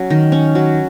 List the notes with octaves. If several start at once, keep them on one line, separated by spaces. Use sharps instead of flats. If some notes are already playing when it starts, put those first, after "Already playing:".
Already playing: F#3 C#4
D#3
C#4
F#3